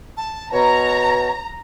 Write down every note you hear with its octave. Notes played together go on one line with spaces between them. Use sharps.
A5
B2 C#5 A#5